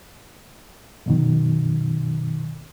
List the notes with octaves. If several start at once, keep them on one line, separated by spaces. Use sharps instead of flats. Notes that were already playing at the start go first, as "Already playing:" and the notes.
F#2 B2 D#3